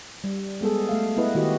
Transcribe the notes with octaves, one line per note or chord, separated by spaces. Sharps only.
G3
G#3 B3 G#4 A4
A3 F5
B3 E4 B4 D#5
D#3 E4 F#4 G4 D#5